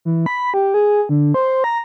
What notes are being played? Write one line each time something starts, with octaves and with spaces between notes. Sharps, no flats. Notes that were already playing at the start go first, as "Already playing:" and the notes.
E3
B5
G4
G#4
D3
C5
A#5